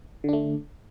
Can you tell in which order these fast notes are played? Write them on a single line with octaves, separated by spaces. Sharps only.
D3 D4 A3